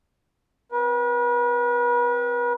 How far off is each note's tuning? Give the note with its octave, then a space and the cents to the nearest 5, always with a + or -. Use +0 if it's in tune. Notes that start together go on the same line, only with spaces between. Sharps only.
C4 +0 B4 -40